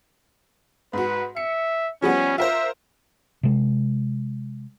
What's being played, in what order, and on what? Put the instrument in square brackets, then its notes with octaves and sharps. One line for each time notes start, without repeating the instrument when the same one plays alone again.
[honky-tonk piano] G#2 F#4 [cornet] B4
[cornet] E5 [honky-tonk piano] C#7
[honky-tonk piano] F3 G3 B3 [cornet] C#4
[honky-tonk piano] F4 A#4 C5 [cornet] E5
[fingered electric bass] C3 G#3